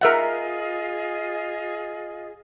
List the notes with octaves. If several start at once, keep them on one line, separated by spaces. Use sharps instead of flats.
F4 G#4 A#4 D#5 E5 F#5